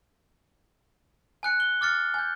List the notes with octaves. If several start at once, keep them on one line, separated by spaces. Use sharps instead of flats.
G#5 F#6 C#7
G7
D6 F6 A6 C#7
G#5 G6